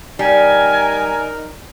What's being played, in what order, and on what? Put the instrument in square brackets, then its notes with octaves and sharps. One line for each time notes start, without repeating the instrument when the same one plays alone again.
[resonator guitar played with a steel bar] G3 [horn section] D#4 A#4 [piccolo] G#5